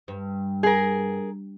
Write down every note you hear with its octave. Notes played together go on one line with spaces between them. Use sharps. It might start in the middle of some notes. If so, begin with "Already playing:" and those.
G2
G#4 A#4